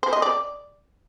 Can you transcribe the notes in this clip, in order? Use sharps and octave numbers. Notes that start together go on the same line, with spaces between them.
C5
D#5
D5